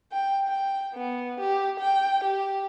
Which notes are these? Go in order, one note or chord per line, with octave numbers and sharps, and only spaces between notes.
G5
G5
B3
G4
G5
G4